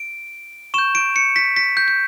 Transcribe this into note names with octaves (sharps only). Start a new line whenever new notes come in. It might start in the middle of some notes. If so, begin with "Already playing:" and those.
Already playing: D7
C#6 G6 E7
D7
C#7
B6
B6
G6
G6